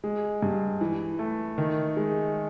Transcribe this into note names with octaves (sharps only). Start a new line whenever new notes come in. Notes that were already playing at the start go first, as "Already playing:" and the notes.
G#3
G2
E3
A3
D#3
G#3